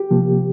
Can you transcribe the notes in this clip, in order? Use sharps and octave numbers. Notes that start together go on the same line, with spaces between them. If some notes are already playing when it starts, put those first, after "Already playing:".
Already playing: G4
C3 F3 A#3